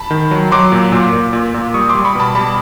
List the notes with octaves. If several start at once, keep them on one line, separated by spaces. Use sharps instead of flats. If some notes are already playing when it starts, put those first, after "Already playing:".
Already playing: A5 B5
D#3
F#3
F#3 C6 D6
A#2
A#2
A#2
A#2
A#2
G3 C#6 D#6
C6 D6
G3
B5 C#6
B2 A5 B5
G3 A5 B5